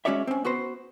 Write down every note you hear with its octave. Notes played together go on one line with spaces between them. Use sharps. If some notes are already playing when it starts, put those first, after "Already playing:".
G#3 C#4 F#4 C#5 D5 E5
C4 C#4
B3 F#4 B4 C5